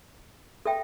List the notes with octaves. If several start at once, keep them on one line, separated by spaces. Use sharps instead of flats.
A4 E5 G5